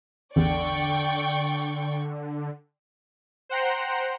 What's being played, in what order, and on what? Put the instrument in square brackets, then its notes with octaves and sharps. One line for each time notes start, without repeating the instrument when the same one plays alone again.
[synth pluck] A1 E2 [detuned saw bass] D3 [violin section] D5 G5 C#6
[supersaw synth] C5 F#5 G5 A#5 C6